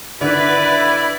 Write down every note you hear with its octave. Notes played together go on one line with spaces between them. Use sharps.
D3 D#3 E4 B4 D5